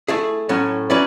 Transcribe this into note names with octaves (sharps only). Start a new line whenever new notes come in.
A3 E4 G#4
A2 F#3 C#4
F#3 C#4 E4 B4 D5